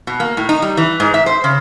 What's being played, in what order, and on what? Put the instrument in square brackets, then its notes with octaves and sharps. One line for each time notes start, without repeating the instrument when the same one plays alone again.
[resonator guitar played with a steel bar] B2
A#3
A2
D#4
G3
E3
G#2
E5
C5
C#3